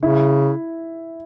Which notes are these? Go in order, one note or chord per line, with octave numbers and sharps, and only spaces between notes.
C#3 E4